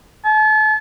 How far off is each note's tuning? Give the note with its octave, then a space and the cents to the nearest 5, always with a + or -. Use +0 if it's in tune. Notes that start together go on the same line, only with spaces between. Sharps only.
A5 -35